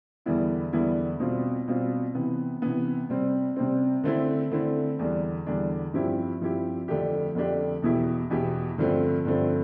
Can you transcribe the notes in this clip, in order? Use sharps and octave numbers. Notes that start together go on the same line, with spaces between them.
E2 D3 G3 B3 E4
E2 D3 G3 B3 E4
B2 G3 C4 F4
B2 G3 C4 F4
C3 E3 B3
C3 E3 B3
C3 G3 C4
C3 G3 C4
D3 A3 C4 E4
D3 A3 C4 E4
E2 D3 G3 D4
E2 D3 G3 D4
G2 F3 C4 E4 G4
G2 F3 C4 E4 G4
F2 D3 A3 D4 G4
F2 D3 A3 D4 G4
E2 B2 B3 E4 G4
E2 B2 B3 E4 G4
G2 D3 F3 A3 C4
G2 D3 F3 A3 C4